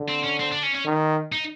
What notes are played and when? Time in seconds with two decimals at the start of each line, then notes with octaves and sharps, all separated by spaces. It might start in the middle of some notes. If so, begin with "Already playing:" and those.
Already playing: D3
0.08 C4
0.24 C#4
0.39 C4
0.52 D4
0.63 C#4
0.75 C#4
0.85 D#3
1.32 D#4